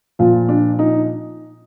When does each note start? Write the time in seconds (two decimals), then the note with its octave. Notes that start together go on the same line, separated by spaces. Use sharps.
0.19 A#2 F3 F4
0.49 D4
0.79 D#4